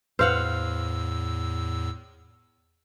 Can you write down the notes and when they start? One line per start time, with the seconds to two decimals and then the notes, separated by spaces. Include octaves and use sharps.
0.19 E2 A2 B4 C5 F5 F#5 E6